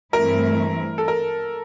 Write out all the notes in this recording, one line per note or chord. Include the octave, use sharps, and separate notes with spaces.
G2 E3 A3 C4 E4 A#4
A4
A#4